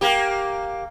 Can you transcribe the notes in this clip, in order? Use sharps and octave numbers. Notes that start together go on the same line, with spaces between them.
A#3 G4